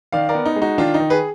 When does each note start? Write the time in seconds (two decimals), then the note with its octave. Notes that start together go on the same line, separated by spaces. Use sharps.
0.12 D#3 D5 F5
0.29 A#4 D5
0.35 B3
0.46 D#4
0.56 G#3
0.61 D#4 F#4
0.78 D#3 D4 F4
0.94 D#4
1.00 D#3
1.10 G#4 B4